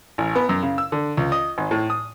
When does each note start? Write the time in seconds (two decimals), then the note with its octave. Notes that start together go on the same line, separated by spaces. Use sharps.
0.18 A1
0.36 B3
0.49 F#2
0.63 C#3
0.78 E6
0.92 D3
1.17 C#2
1.32 D#5
1.58 G#1
1.71 A2
1.90 D#6